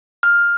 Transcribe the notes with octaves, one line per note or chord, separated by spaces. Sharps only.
F6